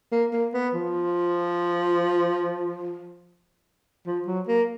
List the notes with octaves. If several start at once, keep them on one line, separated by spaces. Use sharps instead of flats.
A#3
A#3
B3
F3
F3
F#3
A#3